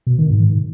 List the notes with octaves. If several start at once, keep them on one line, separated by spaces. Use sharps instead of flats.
B2
D#3
G#2